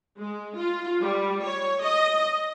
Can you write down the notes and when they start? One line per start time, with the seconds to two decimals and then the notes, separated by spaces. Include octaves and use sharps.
0.18 G#3
0.56 F4
1.00 G3
1.45 C#5
1.81 D#5